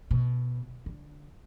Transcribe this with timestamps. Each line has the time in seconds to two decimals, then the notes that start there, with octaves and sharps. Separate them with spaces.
0.11 B2
0.86 D3